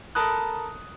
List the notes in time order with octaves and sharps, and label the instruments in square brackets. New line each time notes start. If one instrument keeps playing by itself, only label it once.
[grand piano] A4 A#4 A5 B5 D#6 F#6